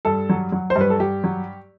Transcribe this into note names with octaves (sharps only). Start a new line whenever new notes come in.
G2 A4
F#3
F#3
C5
G2
B4
A4
G2 G4
F#3